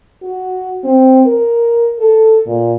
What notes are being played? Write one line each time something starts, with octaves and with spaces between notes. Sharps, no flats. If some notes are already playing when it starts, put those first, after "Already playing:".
F#4
C4
A#4
A4
A#2